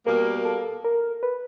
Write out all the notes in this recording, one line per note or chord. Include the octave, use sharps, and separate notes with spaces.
B2 G3 A#3 A#4
A4
A#4
B4